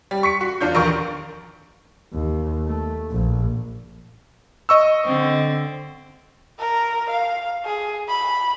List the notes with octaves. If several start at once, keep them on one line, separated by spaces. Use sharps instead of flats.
G3
C#6 B6 C#7
F#4
E2 D4 F4 G6
A#1 D#2 A#4 C#6 D7
D#2
A3
A#1
D#5 C#6 E6
D3 C4
A#4
F5
G#4
B5